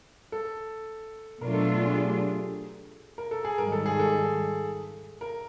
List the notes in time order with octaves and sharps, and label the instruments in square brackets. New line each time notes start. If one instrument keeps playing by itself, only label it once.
[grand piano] A4
[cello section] B2 F#3 A3 D4 F4 [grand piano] A#4
[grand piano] A4
A4
G#4
G4
A#4
A4
G#4
[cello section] G#2 D#3 G3 [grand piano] A#4
[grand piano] A4
G#4
A4
A#4